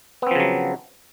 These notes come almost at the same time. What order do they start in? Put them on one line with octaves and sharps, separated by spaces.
B3 C4 F3 C#3 F#3